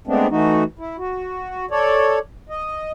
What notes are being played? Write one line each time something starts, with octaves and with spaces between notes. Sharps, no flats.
G#3 A3 B3 C4 D4
E3 A3 D#4 F#4
E4
F#4
A4 C#5 D5
D#5